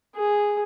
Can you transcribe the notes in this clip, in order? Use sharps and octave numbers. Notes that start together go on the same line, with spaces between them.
G#4